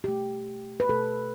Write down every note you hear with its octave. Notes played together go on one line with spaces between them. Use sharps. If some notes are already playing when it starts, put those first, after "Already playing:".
B2 A3 G4
B4
B2 A3 A4